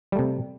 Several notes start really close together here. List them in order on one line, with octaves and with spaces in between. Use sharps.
G3 A3 C3